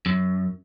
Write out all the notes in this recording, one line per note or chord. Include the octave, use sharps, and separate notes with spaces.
F#2